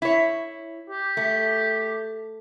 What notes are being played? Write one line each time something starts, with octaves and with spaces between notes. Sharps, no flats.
E4 C#5
G4
A3